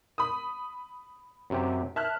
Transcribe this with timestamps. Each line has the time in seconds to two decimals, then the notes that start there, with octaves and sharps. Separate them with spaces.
0.18 B5 D#6
1.50 F#2 C3 G4
1.96 E5 A5 F6 F#6